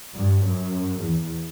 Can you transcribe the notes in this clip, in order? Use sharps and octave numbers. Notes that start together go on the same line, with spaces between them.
G2
F#2
E2